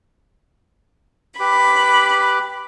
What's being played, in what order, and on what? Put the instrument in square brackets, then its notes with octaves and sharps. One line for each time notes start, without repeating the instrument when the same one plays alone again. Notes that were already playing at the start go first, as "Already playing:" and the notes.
[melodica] G4 B4 D6 [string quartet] B5